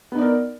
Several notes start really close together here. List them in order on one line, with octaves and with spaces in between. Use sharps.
B3 D#4 D5 A#4